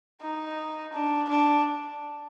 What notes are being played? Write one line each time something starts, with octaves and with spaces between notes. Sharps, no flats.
D#4
D4
D4